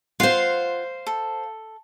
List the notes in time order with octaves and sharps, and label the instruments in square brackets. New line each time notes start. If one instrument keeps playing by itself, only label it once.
[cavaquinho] F4 F#5 [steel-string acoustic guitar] C5 F5
[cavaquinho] A4